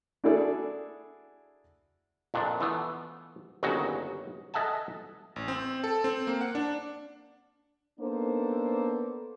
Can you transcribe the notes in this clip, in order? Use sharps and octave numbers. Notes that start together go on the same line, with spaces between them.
D4 E4 F#4 G#4 A4 D5
F2 A#2 D4
E3 A3 B3
G1 D#2 C#3 F#3 F#4
A4 D#5 E5 F#5 G#5 A5
A1
C4
A4
C4
A#3
F#5
D4
A#3 B3 D4 D#4 A4 C5